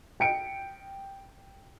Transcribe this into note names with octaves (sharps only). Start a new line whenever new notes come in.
G5 C#7 D7